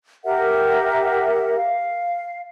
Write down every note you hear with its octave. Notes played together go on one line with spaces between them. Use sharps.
G4 A#4 E5 F#5
F5